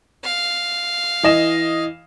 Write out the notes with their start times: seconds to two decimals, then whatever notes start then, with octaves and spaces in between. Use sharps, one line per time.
0.24 F5
1.23 E3 D#5 E7